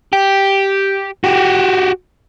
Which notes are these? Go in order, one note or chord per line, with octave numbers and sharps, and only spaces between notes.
G4
F#4 G4